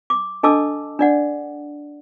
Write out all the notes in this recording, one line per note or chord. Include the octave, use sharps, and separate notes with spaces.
D6
D4 A4 D#5 A5 D6 E6
D4 D5 F#5